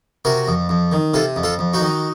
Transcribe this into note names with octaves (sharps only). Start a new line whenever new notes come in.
C3 F#4 A#4
F2
F2
D#3
C3 F4 A4
F2
F4 A4
F2
D#4 F#4
D#3